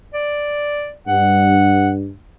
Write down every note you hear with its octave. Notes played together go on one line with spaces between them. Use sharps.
D5
G2 F#5